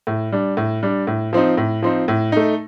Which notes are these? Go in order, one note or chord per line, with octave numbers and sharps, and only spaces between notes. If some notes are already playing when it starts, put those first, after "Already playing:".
A2
G3 D4
A2
G3 D4
A2
F3 C4 D#4
A2
F3 C4 D#4
A2
A3 D#4